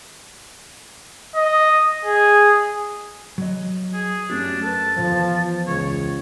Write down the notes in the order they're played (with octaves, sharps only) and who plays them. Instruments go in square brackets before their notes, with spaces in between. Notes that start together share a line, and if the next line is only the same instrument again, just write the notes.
[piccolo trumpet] D#5
G#4
[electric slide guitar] F#3 D#5
[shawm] G#4
[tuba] F#2 [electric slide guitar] A3 C#4 G4 [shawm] D4
[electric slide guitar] A4 B4 [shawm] A5
[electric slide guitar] E2 C3 F4 [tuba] F3
[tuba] C#2 [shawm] C#5